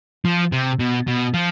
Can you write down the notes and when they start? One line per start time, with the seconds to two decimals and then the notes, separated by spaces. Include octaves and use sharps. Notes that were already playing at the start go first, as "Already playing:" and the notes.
0.25 F3
0.52 C3
0.79 B2
1.07 B2
1.34 F3